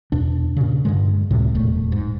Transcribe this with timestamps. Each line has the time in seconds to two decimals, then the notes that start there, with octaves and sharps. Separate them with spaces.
0.12 E2 B2 D4
0.57 A#2 C#3
0.85 G2 D3 G#3
1.31 C#2 A2 C3 G3
1.55 F1 E2 A#2 A3
1.92 G#2